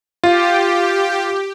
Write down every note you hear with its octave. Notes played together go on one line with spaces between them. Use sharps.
F4 G4